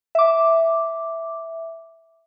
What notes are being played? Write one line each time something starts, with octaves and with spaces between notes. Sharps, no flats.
E5 D6